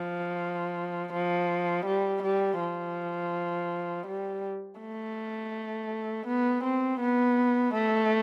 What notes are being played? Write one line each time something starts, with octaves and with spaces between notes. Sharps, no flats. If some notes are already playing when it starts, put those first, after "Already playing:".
Already playing: F3
F3
G3
G3
F3
G3
A3
B3
C4
B3
A3